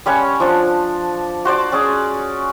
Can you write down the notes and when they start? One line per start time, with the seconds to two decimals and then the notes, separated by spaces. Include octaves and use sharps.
0.06 G3 C#4 C#5 F#5
0.40 F3 D4
1.45 F#4 C5 D5 D6
1.72 C#4 G#4 D5